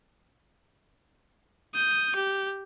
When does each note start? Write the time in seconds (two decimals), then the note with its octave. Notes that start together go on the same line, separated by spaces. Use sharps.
1.75 D#6 G6
2.16 G4